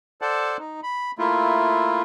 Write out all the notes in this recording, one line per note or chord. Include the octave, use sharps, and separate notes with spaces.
A4 C5 D5 F#5 A5
D#4
B5
A3 A#3 E4 F4